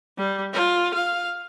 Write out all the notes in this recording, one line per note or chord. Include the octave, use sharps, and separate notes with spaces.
G3
F4
F5